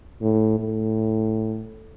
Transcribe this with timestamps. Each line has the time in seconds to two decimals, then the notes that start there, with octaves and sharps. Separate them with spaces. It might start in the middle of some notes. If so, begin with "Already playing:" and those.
0.21 A2
0.60 A2